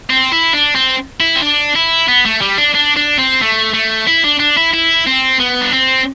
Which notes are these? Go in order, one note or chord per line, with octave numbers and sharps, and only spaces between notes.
C4
E4
D4
C4
E4
C4
D4
E4
B3
A3
G3
D4
D4
D4
C4
A3
A3
E4
D4
D4
E4
E4
C4
B3
D4
C4